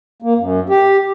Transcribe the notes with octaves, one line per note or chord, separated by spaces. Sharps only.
A#3
F#2
G4